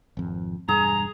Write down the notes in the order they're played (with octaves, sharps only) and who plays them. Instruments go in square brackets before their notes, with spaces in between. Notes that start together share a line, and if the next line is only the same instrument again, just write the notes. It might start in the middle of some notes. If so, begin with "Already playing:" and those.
[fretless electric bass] G#1 F2
[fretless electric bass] E1 G2 [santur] G#4 [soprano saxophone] A#5